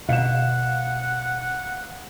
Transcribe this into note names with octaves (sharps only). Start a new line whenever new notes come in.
B2 F5 F#5 E7